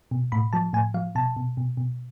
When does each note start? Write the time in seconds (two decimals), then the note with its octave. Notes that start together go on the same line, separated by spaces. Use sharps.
0.11 B2
0.32 A2 B5
0.53 F3 A5
0.73 A2 G#5
0.94 F3 F5
1.15 B2 A5
1.37 B2
1.57 B2
1.77 B2